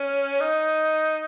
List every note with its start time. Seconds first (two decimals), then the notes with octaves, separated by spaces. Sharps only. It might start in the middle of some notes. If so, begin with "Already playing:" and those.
Already playing: C#4
0.41 D#4